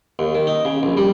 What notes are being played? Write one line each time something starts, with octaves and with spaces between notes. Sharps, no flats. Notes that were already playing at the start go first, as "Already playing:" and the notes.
D#2
D#3
D#4
C#3
A#1
G3